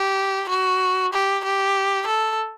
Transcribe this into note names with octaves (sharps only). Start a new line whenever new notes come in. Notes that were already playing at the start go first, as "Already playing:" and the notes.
Already playing: G4
F#4
G4
G4
A4